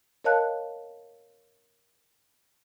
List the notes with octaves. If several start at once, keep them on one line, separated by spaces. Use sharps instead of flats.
A#4 C#5 D#5 F5 A5 F#6